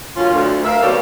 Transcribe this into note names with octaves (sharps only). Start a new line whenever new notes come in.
F#2 D3 C#4 F4
D2
A#4 E5 F5
B2 D#3 F#3 G3 A#3 A4